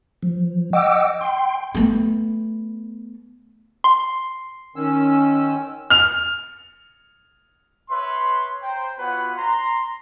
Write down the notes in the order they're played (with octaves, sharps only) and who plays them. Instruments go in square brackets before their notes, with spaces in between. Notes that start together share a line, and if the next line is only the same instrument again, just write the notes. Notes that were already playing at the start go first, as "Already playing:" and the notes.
[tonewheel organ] F3
D#5 F#5 G5 D6 E6
G5 C6
[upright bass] A3 B3
[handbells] C6
[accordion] D#3 C#4 E6
[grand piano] F6 F7
[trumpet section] B4 C#5 E5 C6
C5 G5 A#5
B3 F4 F#4 B4 C#5 F#5
A#5 C6